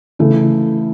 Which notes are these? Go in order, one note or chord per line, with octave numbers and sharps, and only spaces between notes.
C#3 E3 A3